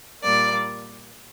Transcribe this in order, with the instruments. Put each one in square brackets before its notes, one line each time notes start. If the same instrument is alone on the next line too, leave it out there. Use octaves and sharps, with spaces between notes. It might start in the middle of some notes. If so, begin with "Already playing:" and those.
[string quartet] A#2 G3 A#3 D5